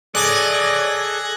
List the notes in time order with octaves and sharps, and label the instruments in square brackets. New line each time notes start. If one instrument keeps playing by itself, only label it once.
[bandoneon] G#4 A4 [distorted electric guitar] D5 D#5 [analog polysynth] F#6 G#6 A#6